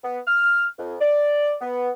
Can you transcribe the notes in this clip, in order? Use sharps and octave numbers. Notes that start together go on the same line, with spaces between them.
B3
F6
F2
D5
B3